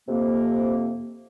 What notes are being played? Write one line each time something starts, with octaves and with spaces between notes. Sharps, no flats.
F2 C3 A#3